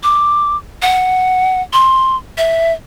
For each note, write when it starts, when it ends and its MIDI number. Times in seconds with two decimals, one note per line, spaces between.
0.03 0.57 86
0.82 1.62 78
1.73 2.16 84
2.38 2.72 76